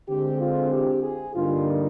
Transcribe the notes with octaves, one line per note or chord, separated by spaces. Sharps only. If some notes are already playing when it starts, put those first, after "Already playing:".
D3 G#3 C4 G4
F4
G4
G#4
G2 D3 G3 A#3 D#4 F4